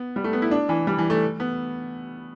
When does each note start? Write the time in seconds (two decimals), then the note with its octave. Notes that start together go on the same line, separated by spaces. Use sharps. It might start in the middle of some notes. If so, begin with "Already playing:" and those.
Already playing: B3
0.16 G3
0.24 A3
0.33 B3
0.42 E4
0.51 D4
0.69 E3
0.87 G3
0.98 E3
1.10 A3
1.40 B3